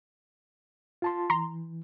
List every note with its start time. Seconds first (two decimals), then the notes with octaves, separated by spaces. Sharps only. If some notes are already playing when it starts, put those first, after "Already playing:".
1.02 F4 A5 C6
1.30 E3 A#5 C6